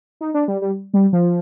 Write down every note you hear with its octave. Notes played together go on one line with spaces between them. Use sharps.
D#4
D4
G3
G3
G3
F3